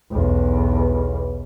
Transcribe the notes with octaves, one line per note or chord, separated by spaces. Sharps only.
B1 E2